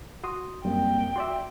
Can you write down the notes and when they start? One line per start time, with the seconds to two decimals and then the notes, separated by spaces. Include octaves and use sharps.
0.24 F#4 C6 D#6
0.65 F#2 G3 A#3 C4 G5
1.16 F#4 D5 E5 C6